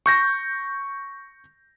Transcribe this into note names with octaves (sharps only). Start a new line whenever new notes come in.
C#6 G6 A#6